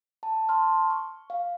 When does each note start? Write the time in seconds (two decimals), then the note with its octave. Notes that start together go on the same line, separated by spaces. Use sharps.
0.23 A5
0.49 A5 C6 F6
0.90 C#6
1.30 F5